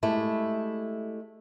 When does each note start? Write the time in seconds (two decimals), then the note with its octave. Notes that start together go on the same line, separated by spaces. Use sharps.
0.03 G#3 A3 E4 G4